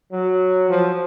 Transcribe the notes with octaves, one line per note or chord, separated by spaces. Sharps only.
F#3
F3